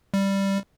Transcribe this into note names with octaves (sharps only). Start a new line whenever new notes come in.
G3